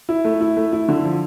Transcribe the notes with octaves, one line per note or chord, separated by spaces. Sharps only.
E4
A3
E4
A3
E4
D3
F3